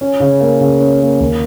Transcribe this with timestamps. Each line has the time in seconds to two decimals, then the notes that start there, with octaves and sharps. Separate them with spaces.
0.01 C#4
0.20 C#3
0.40 A#3
0.61 C#3
0.80 C#4
1.01 A#3
1.20 D#2